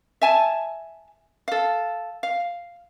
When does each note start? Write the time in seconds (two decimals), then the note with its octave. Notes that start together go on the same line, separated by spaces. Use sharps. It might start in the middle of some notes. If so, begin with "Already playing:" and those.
0.22 E5 G#5 A5
1.48 A4 F5
2.23 F5